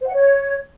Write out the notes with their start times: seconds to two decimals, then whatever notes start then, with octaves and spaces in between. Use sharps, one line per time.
0.01 C5
0.07 F#5
0.13 C#5